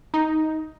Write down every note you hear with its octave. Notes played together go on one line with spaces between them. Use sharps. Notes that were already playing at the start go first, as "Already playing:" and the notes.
D#4